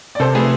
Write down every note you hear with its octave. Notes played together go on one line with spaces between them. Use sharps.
D5
C3 A4 C5
A3 G#4 B4